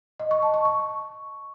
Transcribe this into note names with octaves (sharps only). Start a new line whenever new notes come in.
D#5
C#6
A5
C#6
C#6